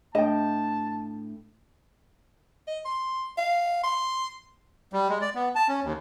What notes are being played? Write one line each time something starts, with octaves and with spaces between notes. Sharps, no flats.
A2 D4 D#5 G5 A5
D#5
C6
F5
C6
G3
G#3
D5
B3
A5
C#4
D#2